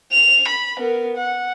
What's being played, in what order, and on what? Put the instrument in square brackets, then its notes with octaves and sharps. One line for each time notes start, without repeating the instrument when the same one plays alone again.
[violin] F7
B5
B3 A#4
F#5